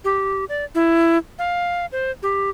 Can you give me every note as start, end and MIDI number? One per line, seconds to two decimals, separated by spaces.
0.04 0.45 67
0.49 0.65 74
0.75 1.18 64
1.39 1.86 77
1.92 2.11 72
2.23 2.50 67